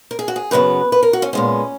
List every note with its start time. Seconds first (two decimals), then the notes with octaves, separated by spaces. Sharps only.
0.11 A#4
0.19 G#4
0.28 F#4
0.36 G#4
0.51 F#2 C#3 F#3 B3 B4
0.92 B4
1.03 A#4
1.13 F#4
1.22 C#4
1.33 A#2 G#3 B3 C#4